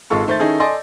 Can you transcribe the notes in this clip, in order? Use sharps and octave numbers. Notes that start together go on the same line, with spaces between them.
G#1 G#2 G#3 F4 A4 C#6
D#3 A3 C5 G6 A6
D#3 C#4 D#4 E4 G#4 A4
A4 D5 D#5 G#5 C6